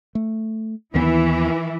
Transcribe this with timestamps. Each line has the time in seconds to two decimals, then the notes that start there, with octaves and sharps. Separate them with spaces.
0.15 A3
0.95 D#2 D#3 E3 B3 E4